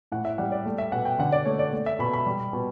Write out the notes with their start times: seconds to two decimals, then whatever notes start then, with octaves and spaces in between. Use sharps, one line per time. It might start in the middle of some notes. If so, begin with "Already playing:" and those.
0.12 A2 F#5
0.25 E5
0.38 G3 F#5
0.52 D5
0.66 A3
0.78 E5
0.92 B2 F#5
1.05 G5
1.19 D3 F#5
1.32 D5
1.45 A3 C#5
1.59 D5
1.73 A3
1.86 E5
1.99 B2 B5
2.13 B5
2.26 G3
2.53 B2